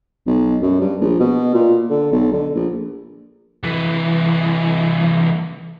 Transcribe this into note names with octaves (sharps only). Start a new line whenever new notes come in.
B1
F#2
G2
A#1
B2
A#2
D3
B1
D3
A#1
C2 E3